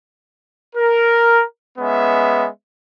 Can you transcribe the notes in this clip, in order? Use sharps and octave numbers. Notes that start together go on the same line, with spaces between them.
A#4
G#3 B3 C#4 E5